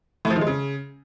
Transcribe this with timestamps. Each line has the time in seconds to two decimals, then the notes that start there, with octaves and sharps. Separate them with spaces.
0.25 A2
0.30 F3
0.36 D#3
0.41 G#3
0.47 C#3